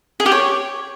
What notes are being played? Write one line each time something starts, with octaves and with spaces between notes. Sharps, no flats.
G#4
G4
C#5